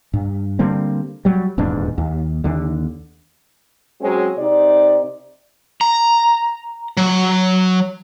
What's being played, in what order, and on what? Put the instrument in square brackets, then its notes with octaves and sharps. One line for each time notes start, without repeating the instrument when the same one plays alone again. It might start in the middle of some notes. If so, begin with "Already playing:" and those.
[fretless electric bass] G2
D3 G3 A#3 C4
F#3 G3
D#1 E2 G#2 D4
D#2
D#2 D3
[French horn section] F#3 G#3 C4 C#4 F#4 C#5
C3 D#4 D5
[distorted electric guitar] A#5
F#3